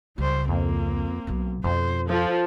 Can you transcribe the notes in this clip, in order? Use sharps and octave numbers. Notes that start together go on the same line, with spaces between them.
C#2 G3 C5
F2 A#3 C4
B1 B2
F2 B2 C5
F3 A4